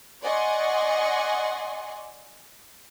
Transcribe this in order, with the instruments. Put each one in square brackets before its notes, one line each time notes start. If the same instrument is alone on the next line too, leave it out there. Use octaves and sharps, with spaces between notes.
[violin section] D5 D#5 F#5 G#5 C6 C#6